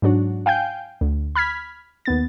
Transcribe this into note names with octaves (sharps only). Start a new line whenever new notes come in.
G#2 F#3 D4 F#4
F5 G5 G#5 G6
D2
B5 F6 G#6 B6
D#2 B3 A6